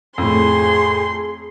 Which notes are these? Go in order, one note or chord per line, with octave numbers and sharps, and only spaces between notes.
F2 A2 G#4 C6